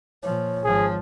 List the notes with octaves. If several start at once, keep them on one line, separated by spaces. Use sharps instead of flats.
A#2 F3 C#5
G#1 F3 G#4